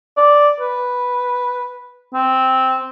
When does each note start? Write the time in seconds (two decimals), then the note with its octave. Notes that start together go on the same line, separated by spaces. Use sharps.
0.17 D5
0.60 B4
2.14 C4